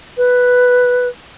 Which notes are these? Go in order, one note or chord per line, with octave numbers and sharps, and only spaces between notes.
B4